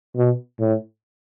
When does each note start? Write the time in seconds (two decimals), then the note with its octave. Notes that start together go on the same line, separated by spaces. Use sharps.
0.16 B2
0.60 A2